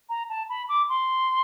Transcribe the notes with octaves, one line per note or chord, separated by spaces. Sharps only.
A#5
A5
B5
D6
C6